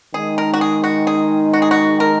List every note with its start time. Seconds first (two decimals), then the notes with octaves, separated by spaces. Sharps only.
0.14 D#3 G#3 D#4 G#4
0.38 A#4
0.53 F#4
0.61 G#4
0.84 F#4
1.07 G#4
1.53 F#4
1.62 G#4
1.71 F#4
2.00 A#4